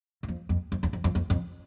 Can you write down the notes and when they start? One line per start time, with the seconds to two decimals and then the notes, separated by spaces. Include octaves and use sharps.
0.23 F#2
0.28 F2
0.49 F2
0.72 F2
0.83 E2
0.93 F2
1.04 F2
1.15 F2
1.30 F2